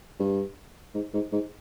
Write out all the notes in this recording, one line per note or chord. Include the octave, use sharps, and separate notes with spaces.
G2
G#2
G#2
G#2